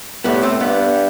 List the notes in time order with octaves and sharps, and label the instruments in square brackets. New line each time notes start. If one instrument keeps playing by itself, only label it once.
[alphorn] A2 [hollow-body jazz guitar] G3 B3
[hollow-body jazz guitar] A3 C4
[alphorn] G2 [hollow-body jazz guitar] G3 B3